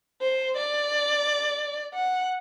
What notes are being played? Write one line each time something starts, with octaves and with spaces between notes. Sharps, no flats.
C5
D5
F#5